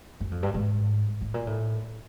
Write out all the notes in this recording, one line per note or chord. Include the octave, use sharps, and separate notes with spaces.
F#2
F2
G2
G#2
A2
A#2
A2